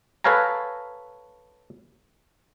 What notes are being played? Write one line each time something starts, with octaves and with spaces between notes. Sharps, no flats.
A4 B4 C#5 F5 G#5 A#5